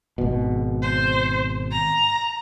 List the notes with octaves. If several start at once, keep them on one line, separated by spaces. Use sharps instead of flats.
G#1 B2
C5
A#5